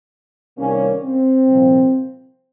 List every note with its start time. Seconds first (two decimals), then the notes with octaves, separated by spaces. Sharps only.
0.58 C2 C3 D#3 G3 A#3 C#4
1.03 C4
1.48 C2 A#2 F3